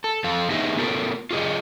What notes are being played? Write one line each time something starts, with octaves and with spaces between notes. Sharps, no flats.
A4
F2 A4 F5
B3 D#4 G4 G#4 D#5 E5
B3 F4 A4 A#4
F4 G4 G#4 D#5